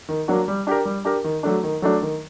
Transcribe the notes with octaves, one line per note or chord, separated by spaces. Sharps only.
D#3
F#3 A#3 D4 F#4
G3
D4 G4 A#4
G3
D4 G4 A#4
D#3
F#3 A3 D4
D#3
F#3 A3 D4
D#3